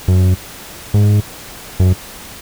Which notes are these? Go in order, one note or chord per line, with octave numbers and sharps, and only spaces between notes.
F#2
G#2
F#2